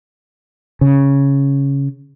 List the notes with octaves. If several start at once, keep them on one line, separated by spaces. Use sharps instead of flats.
C#3